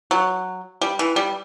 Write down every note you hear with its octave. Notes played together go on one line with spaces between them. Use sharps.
F#3
G3
E3
G3